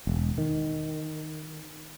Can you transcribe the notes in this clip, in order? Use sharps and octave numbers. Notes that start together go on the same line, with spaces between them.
E1
D#3